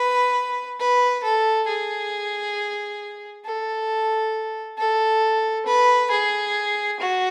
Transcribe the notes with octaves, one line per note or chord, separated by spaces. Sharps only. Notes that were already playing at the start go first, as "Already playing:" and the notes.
Already playing: B4
B4
A4
G#4
A4
A4
B4
G#4
F#4